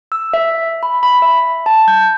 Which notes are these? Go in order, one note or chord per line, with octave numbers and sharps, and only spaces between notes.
E6
E5
B5
B5
E5
A5
G6